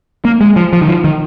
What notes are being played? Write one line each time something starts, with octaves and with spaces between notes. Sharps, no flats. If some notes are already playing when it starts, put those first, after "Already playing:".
A#3
G#3
F3
F3
D#3
F3
D#3